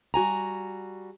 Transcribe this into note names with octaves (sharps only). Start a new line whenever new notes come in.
G3 F#4 G#5 A#5